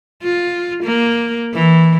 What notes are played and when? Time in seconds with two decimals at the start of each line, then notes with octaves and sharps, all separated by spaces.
0.23 F4
0.84 A#3
1.54 E3